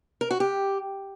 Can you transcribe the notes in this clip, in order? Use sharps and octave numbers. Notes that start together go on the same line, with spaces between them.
A#4
F#4
G4